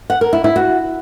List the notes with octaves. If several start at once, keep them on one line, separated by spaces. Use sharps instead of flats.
F#5
A#4
E4
E4
F#4